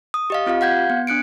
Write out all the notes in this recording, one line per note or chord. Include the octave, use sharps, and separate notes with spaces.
D#6
G4 D#5 F5
C4 F4 G4 F5
F5 F#5 G6 G#6
B3
D4 F#6 C#7 D7